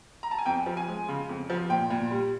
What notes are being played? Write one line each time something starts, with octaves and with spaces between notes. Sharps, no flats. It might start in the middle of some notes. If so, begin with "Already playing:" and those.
A#5
A5
G#5
F2 G5
F3
G#5
G#3
C#3
F2
F3
A#2 G5
A#2
G3